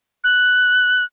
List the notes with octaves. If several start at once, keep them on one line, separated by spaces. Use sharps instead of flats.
F#6